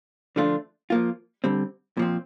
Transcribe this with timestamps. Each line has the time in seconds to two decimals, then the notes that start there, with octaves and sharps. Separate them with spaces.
0.36 D3 F3 A3 D4 F4
0.90 F3 A#3 F4
1.44 D3 G3 C4
1.97 A#2 F3 C4